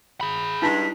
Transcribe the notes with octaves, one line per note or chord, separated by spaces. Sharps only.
G#4 B5
G2 G#3 D#4 E4 B6